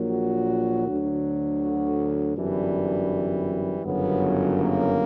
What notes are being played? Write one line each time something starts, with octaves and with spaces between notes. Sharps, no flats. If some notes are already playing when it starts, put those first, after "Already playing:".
Already playing: A#1 A#2 F#3
F#4
D2 D3 F#3
F#4
G1 F#2 E3 G3 D4
G1 F#2 C#3 F#3 B3
A#3